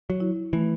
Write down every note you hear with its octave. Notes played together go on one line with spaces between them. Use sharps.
F#3
E4
E3 A3